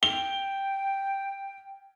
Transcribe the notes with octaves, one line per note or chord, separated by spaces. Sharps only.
G5 G7